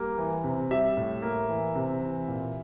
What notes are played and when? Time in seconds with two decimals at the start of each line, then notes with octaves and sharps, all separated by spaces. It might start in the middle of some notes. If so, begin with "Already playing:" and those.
Already playing: G3 A#3
0.18 E3
0.44 C3
0.71 G3 E5
0.97 A2
1.22 A#3
1.49 E3
1.76 C3
2.02 E3
2.28 A#2